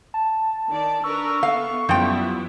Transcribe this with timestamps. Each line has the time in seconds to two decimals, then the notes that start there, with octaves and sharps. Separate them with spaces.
0.14 A5
0.69 D#3 D5
1.04 D4 A#4 B4 C#6 E6
1.43 B3 A4 F5
1.89 F#2 F3 G3 B3 E4 G5